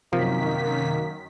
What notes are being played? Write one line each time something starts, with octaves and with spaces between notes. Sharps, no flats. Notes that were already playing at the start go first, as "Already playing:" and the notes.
F#2 C3 D#3 F3 A#3 B6